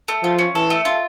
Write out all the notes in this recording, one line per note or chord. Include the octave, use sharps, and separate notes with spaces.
A3
F3 F4
C#4
E3 A4
A3
F4